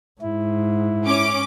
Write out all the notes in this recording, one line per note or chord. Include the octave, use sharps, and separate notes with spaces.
G#2 E4
C#4 D6 D7